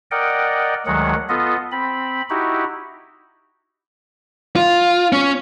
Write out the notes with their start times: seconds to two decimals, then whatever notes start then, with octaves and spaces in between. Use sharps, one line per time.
0.11 A#4 D5 D#5 F#5 G5
0.86 D2 D#3 F#3 G#3 F#5
1.29 B3 F4 A4 D#5
1.72 C4 B5
2.30 D#4 E4 F#4 G4
4.56 F4
5.13 C#4